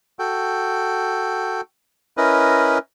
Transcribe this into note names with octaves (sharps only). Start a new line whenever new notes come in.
F#4 A4 G5
C#4 E4 A#4 B4 D#5